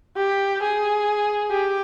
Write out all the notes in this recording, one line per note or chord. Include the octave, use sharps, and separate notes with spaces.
G4
G#4
G4